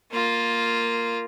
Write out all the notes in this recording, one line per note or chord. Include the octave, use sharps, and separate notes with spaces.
A#3 F4